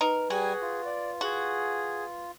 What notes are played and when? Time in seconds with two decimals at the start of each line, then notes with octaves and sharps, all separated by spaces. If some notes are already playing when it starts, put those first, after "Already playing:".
0.01 D#4 A#4 B4
0.30 G3 F#4 G#4 G#5
0.61 F4
0.85 D5
1.21 F#4 G#4